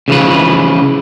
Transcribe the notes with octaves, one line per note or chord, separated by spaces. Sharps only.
C#3 E3 F3 B4